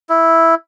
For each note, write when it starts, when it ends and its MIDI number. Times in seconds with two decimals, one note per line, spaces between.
0.09 0.55 64